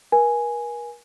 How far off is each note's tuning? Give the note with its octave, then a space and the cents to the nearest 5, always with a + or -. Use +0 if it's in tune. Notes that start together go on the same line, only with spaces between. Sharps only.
A#4 +40 G#5 +0